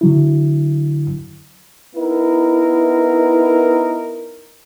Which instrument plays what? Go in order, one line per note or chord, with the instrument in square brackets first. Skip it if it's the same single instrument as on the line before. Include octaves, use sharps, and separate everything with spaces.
[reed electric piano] D3 F#3 E4
[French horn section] B3 D#4 E4 A#4